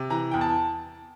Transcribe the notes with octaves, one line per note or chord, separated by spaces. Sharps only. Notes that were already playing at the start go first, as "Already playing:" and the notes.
Already playing: C3
E3 A#5
E2 G5
A5